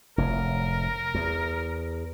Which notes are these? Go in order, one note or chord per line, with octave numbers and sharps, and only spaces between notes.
F1 A2 A#4
E2